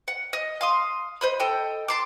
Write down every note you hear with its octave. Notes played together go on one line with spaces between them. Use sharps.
F#5
D#5
F5 C6 D#6
C5 D#5 B5
A4 D#5 G5
A5 C6 D6